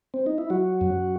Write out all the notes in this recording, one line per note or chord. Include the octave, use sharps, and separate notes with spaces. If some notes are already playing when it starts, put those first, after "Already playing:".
C4
D#4
E4
F#3 F#4
F#2